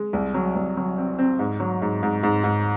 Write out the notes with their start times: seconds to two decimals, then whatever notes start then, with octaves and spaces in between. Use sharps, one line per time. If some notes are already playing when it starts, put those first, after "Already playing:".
Already playing: G#3
0.13 C2
0.34 F#3
0.55 C2
0.77 F#3
0.98 C4
1.19 C4
1.39 G#2
1.60 F#3
1.82 G#2
2.03 G#2
2.23 G#2
2.44 G#2